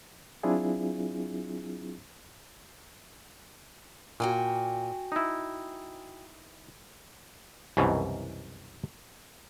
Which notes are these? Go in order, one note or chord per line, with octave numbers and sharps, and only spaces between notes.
F#3 C4 D4 E4 F4 G#4
A#2 F#4 G5 G#5
D#4 E4
C2 F#2 B2 D#3 E3